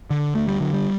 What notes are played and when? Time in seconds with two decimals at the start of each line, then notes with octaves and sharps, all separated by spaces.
0.10 D3
0.35 D2 A3
0.48 G3
0.60 D3 F#3
0.73 G3